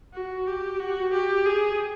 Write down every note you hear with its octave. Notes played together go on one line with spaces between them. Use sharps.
F#4
G4
F#4
G4
G#4